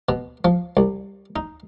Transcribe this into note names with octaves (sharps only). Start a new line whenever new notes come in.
B2
F3
C2
D#4